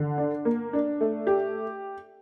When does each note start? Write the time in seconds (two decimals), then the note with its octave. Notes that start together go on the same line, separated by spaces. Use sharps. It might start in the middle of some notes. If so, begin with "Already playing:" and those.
Already playing: D3
0.18 D4
0.45 A#3
0.73 D4
1.01 A3
1.27 G4